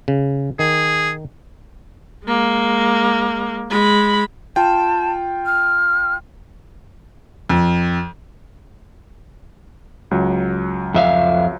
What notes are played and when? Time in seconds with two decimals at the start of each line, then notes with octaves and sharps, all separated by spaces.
0.08 C#3
0.59 D#3 G#4
2.24 G#3 A#3
3.70 G#3 B5
4.56 F4 G5 A5
5.46 F6
7.50 F2
10.11 C#2 F#3
10.94 F2 E5 F5